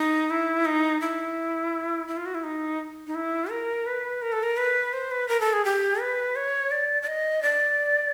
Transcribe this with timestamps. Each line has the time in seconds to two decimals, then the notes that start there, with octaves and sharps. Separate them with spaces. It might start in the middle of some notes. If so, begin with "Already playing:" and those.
Already playing: D#4
0.30 E4
0.65 D#4
1.01 E4
2.08 E4
2.17 F4
2.26 F#4
2.35 E4
2.43 D#4
3.07 D#4
3.15 E4
3.50 A#4
3.86 B4
4.22 A#4
4.32 A4
4.43 A#4
4.57 B4
4.93 C5
5.11 B4
5.28 A#4
5.41 A4
5.53 G#4
5.65 G4
6.00 B4
6.36 C#5
6.71 D5
7.02 D5
7.07 D#5
7.42 D5